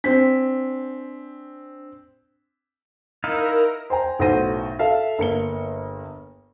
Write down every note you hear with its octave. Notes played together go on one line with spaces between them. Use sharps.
C4 D4 B6
D#4 E4 A#4 F5
C5 G5 G#5 A#5
B1 A2 F#4 C5 A#6 D#7
A4 E5 F5
G1 A#3 C#7 G7